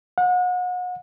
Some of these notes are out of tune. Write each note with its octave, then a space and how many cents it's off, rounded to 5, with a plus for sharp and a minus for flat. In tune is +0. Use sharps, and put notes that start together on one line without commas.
F#5 -35